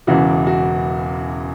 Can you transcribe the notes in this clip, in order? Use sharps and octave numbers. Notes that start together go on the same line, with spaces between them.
E1 E2 C#3 E3 F#4
F#4